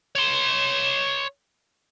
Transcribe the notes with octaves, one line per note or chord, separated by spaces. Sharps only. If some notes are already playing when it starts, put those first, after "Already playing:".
C#5 C6